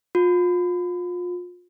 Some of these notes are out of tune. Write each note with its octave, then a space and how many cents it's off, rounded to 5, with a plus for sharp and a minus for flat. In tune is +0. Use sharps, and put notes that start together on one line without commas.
F4 +30